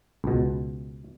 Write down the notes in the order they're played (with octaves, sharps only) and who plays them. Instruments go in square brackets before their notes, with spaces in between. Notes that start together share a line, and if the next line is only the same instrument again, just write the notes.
[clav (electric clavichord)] C#2 B2